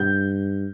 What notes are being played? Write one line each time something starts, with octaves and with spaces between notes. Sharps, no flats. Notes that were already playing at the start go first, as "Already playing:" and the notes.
Already playing: G2 G6